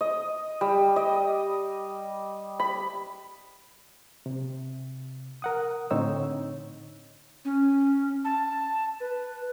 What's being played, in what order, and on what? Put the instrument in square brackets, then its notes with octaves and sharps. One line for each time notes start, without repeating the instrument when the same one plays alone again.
[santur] D#5
G3
D#5
B5
[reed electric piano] C3
A#4 F#5 D#6
A2 D3 C4 D#4 C#5 E6
[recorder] C#4
A5
B4